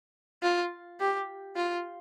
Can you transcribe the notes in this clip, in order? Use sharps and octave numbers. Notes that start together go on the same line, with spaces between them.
F4
G4
F4